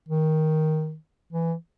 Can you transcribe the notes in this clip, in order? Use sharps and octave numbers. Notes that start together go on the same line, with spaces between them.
D#3
E3